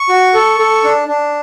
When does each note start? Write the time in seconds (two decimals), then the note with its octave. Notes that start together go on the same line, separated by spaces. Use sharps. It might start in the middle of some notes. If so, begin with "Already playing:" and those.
Already playing: C#6
0.09 F#4
0.34 A4
0.59 A4
0.84 D4
1.08 D4